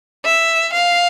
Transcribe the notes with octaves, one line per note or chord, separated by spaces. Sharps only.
E5
F5